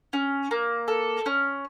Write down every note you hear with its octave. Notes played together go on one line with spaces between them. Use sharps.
C#4
A#3
A4
C#4